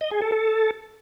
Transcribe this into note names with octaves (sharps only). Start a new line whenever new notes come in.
D#5
G#4
A4
A4